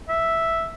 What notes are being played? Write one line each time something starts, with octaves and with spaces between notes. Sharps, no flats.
E5